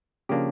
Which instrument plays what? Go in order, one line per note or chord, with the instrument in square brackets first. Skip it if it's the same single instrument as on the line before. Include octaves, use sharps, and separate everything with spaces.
[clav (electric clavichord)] C#3 F3 A#3 D4 G4